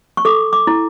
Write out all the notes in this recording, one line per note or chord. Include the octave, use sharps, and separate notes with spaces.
C#6
A4 D6
D6
E4